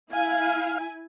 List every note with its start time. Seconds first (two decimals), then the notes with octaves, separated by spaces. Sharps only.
0.13 E4 F5 G#5